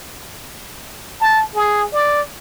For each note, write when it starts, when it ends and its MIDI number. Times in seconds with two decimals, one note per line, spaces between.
1.20 1.43 81
1.55 1.86 68
1.93 2.21 74